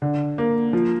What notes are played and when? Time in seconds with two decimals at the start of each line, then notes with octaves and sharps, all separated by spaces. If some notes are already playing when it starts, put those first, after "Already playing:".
0.02 D3
0.38 A#3
0.73 F3